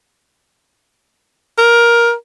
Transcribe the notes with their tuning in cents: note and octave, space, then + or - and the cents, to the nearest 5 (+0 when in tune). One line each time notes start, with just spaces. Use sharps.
A#4 +15